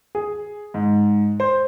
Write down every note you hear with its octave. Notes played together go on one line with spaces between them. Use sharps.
G#4
G#2
C5